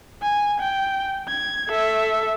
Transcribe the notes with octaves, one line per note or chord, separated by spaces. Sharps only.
G#5
G5
G#6
A4 E5